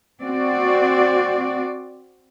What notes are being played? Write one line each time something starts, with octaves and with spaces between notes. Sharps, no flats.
C4 F#4 D5